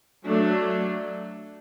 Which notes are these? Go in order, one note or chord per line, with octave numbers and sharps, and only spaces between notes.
F#3 A3 D4